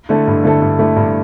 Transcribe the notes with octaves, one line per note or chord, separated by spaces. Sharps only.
D3 A3 E4 A4
G2
D3 A3 E4 A4
G2
D3 A3 E4 A4
G2